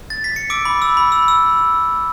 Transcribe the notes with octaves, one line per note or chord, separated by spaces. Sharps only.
A6
B6
C#7
D6 E6 D7
B5
E6
B5
E6
E6